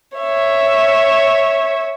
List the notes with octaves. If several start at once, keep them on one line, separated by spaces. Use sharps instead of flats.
C#5 E5